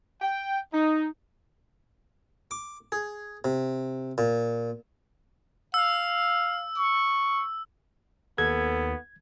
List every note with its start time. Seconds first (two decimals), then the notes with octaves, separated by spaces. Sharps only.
0.21 G5
0.73 D#4
2.51 D6
2.92 G#4
3.44 C3
4.18 A#2
5.74 F5 E6
6.76 C#6
8.38 D#2 B3 A4 G#6